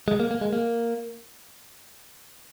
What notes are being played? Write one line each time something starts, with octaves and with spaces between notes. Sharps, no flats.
G#3
A#3
A#3
G#3
A#3